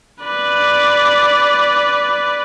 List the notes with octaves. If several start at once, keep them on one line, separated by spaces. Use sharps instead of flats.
B4 D5